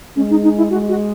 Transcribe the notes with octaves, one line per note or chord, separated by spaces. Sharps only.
G#3 C#4
D#4
D#4
E4
G#3 F#4
F#4